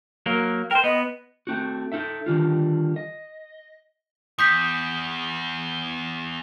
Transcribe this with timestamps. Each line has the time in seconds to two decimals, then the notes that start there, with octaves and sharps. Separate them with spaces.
0.26 F#3 A#3 A#4
0.71 A#4 C5 G5
0.84 B3 D#5
1.47 A3 C4 F#4
1.92 D#4 A4 E5
2.26 D3 D#3 G3 F4
2.96 D#5
4.39 E2 D#6 G6 B6